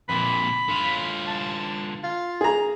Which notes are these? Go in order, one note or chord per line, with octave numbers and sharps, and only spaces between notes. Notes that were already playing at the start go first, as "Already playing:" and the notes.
F2 A#2 B5
D3 F4
A5
F4
G#4 A#5